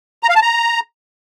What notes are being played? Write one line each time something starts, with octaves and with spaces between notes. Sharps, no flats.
A#5
F5
A5
A#5